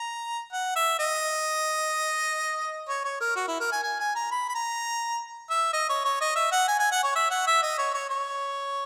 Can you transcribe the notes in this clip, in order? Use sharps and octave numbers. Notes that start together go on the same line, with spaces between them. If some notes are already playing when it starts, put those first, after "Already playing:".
Already playing: A#5
F#5
E5
D#5
C#5
C#5
A#4
F#4
E4
A#4
G#5
G#5
G#5
A#5
B5
B5
A#5
E5
D#5
C#5
C#5
D#5
E5
F#5
G#5
G#5
F#5
C#5
E5
F#5
E5
D#5
C#5
C#5
C#5